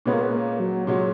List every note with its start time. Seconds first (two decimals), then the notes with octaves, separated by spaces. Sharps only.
0.06 A#2 G#3 B3 C#4
0.13 A#3
0.21 B3
0.32 A#3
0.60 F#3
0.87 A#2 F#3 G#3 C#4